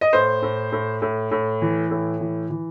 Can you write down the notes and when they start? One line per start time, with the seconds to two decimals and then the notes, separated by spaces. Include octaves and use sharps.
0.01 D#5
0.13 A2 C5
0.42 A2
0.72 A2
1.02 A2
1.31 A2
1.62 E3
1.91 A2
2.20 E3
2.50 E3